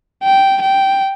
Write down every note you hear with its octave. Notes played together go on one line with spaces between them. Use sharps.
G5
G5